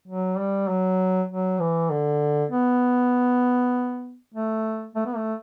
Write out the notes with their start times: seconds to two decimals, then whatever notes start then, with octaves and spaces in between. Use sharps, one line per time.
0.08 F#3
0.38 G3
0.68 F#3
1.29 F#3
1.60 E3
1.90 D3
2.51 B3
4.34 A3
4.95 A3
5.06 B3
5.16 A3